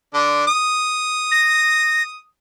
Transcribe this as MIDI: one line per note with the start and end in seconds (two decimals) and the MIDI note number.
0.14 0.43 50
0.14 0.43 62
0.47 2.20 87
1.32 2.03 94